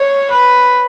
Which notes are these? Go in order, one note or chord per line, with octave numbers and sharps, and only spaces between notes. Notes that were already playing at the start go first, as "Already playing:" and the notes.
Already playing: C#5
B4